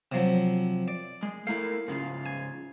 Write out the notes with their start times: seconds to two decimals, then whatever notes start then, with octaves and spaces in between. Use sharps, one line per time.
0.12 C3 F3 F#3
0.88 D5
1.23 G#3
1.47 A3 A#3 E4 F5
1.88 G#2 C#3 F4
2.26 G#5